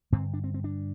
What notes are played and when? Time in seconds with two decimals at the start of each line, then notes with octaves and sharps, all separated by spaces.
0.12 G2 D3 C4
0.34 D4
0.44 C4
0.54 C4
0.64 D4